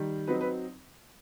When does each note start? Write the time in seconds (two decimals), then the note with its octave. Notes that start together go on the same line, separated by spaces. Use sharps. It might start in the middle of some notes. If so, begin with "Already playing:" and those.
Already playing: D#3 G3
0.27 F#3 C4 D#4 B4
0.41 B4